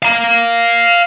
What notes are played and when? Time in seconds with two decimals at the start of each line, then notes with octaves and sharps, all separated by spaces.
0.03 F5 A#5